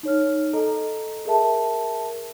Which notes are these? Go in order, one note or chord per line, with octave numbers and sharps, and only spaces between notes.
D#4 C#5 F6
A4 D#5 A#5
G#4 A#4 E5 A5